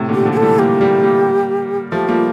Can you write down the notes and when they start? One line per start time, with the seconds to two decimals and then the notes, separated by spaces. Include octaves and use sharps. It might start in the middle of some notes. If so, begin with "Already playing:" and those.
Already playing: A2 C3
0.09 A#2 D3
0.14 G4
0.25 D3 F3
0.32 G4
0.37 A4
0.42 E3 G3
0.59 G3 A#3 G4
0.81 G3 A#3
1.03 G3 A#3
1.92 F3 A3 G4
2.09 G3 A#3 F4